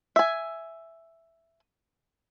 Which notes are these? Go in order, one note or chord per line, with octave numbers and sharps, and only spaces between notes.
E5 G#5